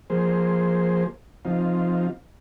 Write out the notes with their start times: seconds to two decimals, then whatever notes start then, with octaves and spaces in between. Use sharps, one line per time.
0.10 F3 A#3 G#4 C5
1.45 F3 C4 D#4 F4